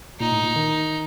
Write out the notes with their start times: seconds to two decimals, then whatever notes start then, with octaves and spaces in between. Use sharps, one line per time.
0.20 A#2 D#4
0.32 A2
0.43 A#2
0.56 D#3